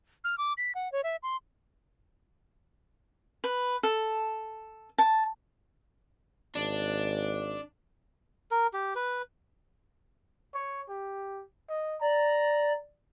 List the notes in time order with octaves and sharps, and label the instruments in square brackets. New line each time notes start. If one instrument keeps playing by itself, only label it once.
[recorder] F6
D6
B6
F#5
C#5
E5
C6
[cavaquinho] B4
A4
A5
[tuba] G#1 [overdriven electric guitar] D4
[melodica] A#4
G4
B4
[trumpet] C#5
G4
D#5
[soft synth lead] D5 [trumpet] A#5